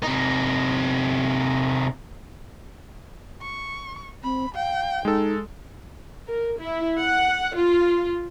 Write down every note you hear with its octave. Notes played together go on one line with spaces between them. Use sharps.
C3 D#4
C#6
C4 B5
F5 G5
G#3 D#4 A4
A#4
E4
F#5
F4